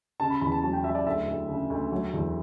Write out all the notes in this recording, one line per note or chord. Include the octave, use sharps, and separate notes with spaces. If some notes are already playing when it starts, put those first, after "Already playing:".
C#3 A5
B5
E2 B5
A5
F#3 A5
G5
F#3 E5
D5
D2 E5
D2
C#3
D2
F#3
E2